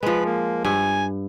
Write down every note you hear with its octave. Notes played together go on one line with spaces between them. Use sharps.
F3 G#3 B4
A#3
G2 G#5